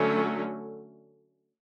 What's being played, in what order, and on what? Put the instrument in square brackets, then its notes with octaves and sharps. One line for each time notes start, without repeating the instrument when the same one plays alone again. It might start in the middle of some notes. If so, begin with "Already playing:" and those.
Already playing: [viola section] D3 F#3 A3 C#4